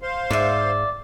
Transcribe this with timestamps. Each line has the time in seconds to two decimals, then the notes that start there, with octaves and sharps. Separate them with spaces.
0.02 C5 F5 C6
0.31 G#2 D5 E5